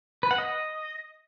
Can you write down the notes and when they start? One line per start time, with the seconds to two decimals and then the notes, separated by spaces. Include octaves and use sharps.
0.23 B4
0.31 F#5
0.38 D#5